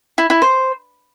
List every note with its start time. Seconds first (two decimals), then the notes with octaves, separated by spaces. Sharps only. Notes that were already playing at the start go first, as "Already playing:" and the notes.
0.18 E4
0.30 E4
0.42 C5